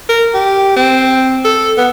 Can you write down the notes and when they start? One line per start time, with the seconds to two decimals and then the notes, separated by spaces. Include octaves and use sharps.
0.09 A#4
0.34 G4
0.76 C4
1.44 A4
1.78 B3